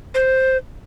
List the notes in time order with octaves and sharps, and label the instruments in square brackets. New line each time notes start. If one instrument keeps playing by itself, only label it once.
[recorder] C5